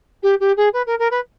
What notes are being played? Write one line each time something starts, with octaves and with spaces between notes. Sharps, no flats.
G4
G4
G#4
B4
A#4
A#4
B4